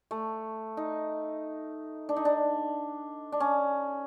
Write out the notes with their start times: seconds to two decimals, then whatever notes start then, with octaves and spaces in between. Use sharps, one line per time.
0.11 A3
0.77 D#4
2.09 D4
2.17 D#4
2.25 D4
3.32 D4
3.40 C#4